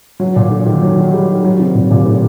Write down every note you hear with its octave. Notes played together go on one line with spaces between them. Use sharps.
F#3
A#2
D3
D#3
F#3
G3
F#3
C3
A#2
A#2
A2